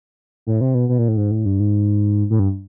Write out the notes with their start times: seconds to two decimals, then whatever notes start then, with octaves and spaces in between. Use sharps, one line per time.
0.47 A2
0.61 C3
0.75 B2
0.89 B2
0.99 A#2
1.08 A2
1.17 G#2
1.31 A2
1.45 G2
1.60 G#2
2.30 A2
2.39 G2